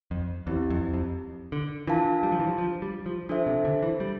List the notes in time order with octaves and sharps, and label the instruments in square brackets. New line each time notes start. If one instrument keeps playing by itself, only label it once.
[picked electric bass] F2
[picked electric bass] E2 [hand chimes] C4 E4 G4
[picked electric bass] F2
F2
D3
[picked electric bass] E3 [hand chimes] D4 F4 A#4 F5 A5
[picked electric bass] G3
F3
E3
F3
F3
G3
F3
[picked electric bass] F3 [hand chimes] D4 A4 C5 E5
[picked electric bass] C3
D3
E3
G3